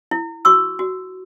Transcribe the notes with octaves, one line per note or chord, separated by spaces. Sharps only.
E4
F#4 C#6 E6
F#4